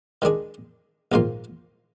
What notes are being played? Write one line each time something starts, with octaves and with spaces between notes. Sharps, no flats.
D#3 G#3 D4 G#4
A#1 G#2 D#3 A#3 F4